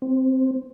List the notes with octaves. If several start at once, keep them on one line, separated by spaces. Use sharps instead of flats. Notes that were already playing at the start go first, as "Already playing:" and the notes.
C4